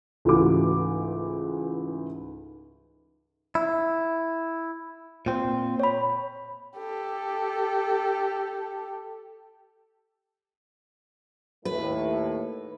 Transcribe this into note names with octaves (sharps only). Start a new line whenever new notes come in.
C#2 G#2 E3 A3 F#4 D6
E4
A#2 C4
C#5 B5
G4 A4
D#2 A2 A3 B4